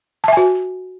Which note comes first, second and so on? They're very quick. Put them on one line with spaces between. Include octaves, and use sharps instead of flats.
A5 E5 G#5 F#4